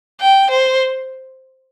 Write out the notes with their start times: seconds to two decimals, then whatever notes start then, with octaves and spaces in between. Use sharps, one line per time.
0.21 G5
0.50 C5